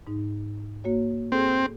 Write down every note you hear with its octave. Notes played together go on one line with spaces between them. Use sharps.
G#2 D#4
A#3 F#4 C#5
C4 G#4 A4